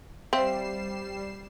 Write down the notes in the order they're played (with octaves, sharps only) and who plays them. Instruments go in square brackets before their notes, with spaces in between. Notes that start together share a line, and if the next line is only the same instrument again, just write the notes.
[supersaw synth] G3 C7 E7 [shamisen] C4 [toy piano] C5 E5 F5